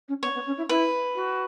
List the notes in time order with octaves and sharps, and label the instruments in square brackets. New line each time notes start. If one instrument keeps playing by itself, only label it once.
[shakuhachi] C#4
[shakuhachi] B3 [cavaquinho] C#5
[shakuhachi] B3
C#4
E4
[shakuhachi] E4 [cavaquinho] B4
[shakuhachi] F#4